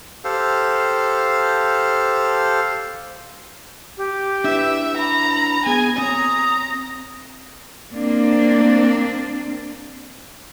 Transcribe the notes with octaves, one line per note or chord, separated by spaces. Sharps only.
G4 A4 C5 F5
G4
D4 E4 B4 E5
A#5 B5
B3 G#4 G#5
C4 C#5 A#5 D#6
A#3 C4 D4